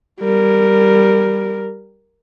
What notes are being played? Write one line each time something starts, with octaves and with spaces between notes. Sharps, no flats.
G3 A#4